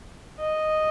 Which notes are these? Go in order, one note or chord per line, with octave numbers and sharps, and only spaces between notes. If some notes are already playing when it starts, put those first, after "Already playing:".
D#5